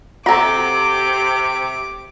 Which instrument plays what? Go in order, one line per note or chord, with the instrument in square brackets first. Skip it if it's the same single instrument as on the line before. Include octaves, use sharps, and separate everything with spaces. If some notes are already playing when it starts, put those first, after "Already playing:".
[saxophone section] C3 [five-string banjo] F#4 A4 [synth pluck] A#5 [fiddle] D6